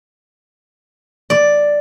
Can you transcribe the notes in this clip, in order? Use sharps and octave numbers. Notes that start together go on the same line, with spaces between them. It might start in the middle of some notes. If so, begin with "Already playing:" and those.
D5